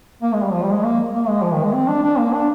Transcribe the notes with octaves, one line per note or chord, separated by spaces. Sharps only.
A#3
G#3
G3
F3
G3
G#3
A#3
A#3
G#3
F3
D#3
G#3
C4
D4
D4
A#3
D4